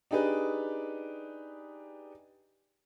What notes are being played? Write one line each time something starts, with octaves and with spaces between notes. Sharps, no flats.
D4 D#4 G4 G#4 B4